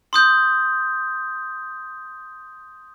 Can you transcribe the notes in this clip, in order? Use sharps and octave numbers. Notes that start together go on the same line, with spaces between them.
C6 D#6 G6